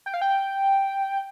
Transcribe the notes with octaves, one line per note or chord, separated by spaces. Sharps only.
G5
F5
G5